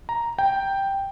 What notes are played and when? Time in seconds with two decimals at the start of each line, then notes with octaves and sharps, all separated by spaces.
0.09 A#5
0.39 G5